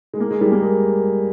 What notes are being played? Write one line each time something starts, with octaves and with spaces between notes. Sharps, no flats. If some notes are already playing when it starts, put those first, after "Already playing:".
G#3
A#3
G#3
G3
A#3
G#3